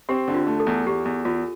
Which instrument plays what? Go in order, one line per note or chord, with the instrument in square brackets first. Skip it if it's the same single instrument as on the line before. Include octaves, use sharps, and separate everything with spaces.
[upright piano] C4 [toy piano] G4
[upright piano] D3
[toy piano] F4
[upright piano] A3
[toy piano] A4
[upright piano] E2
[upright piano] E2 [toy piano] G4
[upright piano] E2
[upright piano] E2 [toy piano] F4